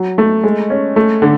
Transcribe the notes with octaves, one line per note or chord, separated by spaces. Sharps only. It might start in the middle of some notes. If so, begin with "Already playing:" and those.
Already playing: F#3
A3
G#3
C#4
A3
D3